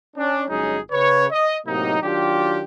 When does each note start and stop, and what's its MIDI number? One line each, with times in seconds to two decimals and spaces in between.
0.16 0.44 61
0.16 0.44 62
0.48 0.78 31
0.48 0.78 54
0.48 0.78 56
0.48 0.78 61
0.48 0.78 63
0.48 0.78 68
0.92 1.26 49
0.92 1.26 71
0.92 1.26 73
1.31 1.57 75
1.67 1.98 45
1.67 1.98 48
1.67 1.98 54
1.67 1.98 58
1.67 1.98 63
2.02 2.62 51
2.02 2.62 54
2.02 2.62 62
2.02 2.62 65
2.02 2.62 67